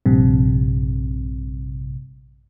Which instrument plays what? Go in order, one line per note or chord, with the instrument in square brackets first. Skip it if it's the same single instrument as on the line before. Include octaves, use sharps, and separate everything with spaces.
[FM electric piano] A#1 G2 C3